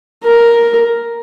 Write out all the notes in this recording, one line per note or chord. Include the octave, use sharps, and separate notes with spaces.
A#4